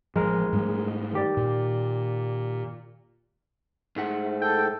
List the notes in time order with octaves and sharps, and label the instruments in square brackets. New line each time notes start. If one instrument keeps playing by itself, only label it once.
[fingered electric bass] A1 F3 [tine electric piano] G#3 A#4
[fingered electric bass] G#2 G3 A3
[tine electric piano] D#3 G4 D5
[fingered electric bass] A#2
[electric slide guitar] G#2 A3 F#5
[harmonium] A4 [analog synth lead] G5